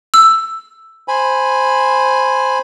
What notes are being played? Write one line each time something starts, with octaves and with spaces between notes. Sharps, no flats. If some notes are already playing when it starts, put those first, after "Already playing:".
E6
C5 G#5 B5